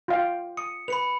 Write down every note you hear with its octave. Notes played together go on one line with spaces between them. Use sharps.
F4 F5 G5
D#6 C#7
B4 B5 C#7 F7